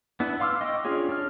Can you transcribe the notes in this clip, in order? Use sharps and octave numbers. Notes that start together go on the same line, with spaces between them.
B3 D4 E4 B4
F5 C6 D6 E6 F6
D#5 G5 C#6 D6
C#4 D4 F4 G#4 C#5
D4 C#5 F6